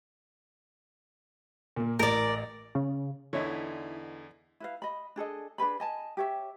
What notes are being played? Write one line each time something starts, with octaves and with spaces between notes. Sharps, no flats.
A#2 A#3
A1 A#4 D5
C#3
E2 D3 E3 D#4 E4 C#5 D#5 B6
E4 B4 F5
D#5 B5
D4 G#4 A4 D#5
D4 G#4 B4 B5
D#5 G#5 A5
G4 C#5 E5